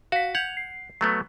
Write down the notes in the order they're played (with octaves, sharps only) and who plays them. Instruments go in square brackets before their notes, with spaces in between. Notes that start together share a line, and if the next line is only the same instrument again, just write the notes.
[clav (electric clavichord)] F#4 [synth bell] F5 B6
[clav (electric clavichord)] F#5 [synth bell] G6 G#6 F7
[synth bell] C7
[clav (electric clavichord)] F#3 A3 B3